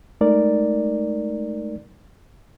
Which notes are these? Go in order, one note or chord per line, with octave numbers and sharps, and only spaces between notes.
G#3 A3 D#4 A#4 D5